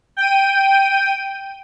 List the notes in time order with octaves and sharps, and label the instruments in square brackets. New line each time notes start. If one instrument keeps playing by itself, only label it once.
[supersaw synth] G5 D#7